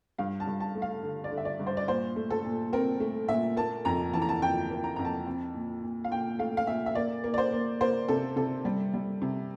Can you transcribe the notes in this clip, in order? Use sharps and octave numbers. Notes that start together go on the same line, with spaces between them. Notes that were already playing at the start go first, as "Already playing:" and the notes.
G2 F5
A5
G2
A5
A3
F5
D3
D5
D3
E5
D5
G2
C5
D5
A#2 C5
A3
A4
A#2
C4 A#4
A3
A#2 E5
A#3 A5
F2 A#5
E3 A5
A#5
A5
F2 G5
A#3
A#5
F2 A#5
A5
C4
A#2
A#2
F5
A#2 G5
A3 F5
F5
A#2 E5
E5
A#3 D5
A#3
D5
C5
A#3
A#3 C5
C3 A4
C3 A4
G3
G3
C3